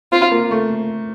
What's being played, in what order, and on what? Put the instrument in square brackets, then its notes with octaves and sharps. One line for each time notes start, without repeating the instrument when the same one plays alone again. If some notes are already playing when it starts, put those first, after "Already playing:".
[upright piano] C4 [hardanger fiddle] F4
[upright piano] A#3
A3